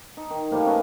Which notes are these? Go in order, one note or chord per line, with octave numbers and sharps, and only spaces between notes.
D#4
D#3
A2 F3 G3 A#3
C#4 A#4 B4 D#5